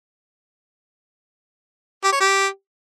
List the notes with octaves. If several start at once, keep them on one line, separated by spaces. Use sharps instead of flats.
G4
C#5
G4